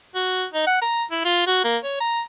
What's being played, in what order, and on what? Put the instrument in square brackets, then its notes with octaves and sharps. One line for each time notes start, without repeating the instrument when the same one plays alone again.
[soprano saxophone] F#4
D#4
F#5
A#5
E4
F4
F#4
A#3
C#5
A#5